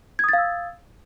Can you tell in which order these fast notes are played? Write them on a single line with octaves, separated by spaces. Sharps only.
G#6 D#6 A6 F5 E6